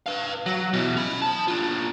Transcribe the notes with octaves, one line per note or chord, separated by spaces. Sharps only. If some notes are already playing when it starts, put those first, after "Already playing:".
B4 F5
F#3
B2 E3
C#4 B5
C5 A5
D4 F4